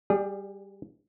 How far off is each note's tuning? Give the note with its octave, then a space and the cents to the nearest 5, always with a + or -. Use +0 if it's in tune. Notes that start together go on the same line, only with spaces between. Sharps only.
G3 +0 G#4 -25 D5 +25